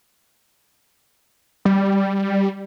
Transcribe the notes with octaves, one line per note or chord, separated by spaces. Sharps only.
G3